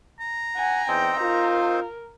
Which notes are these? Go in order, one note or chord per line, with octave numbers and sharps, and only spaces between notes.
A#5
F#5 G#5
E2 C4 D#4 C5 G5
F4 A#4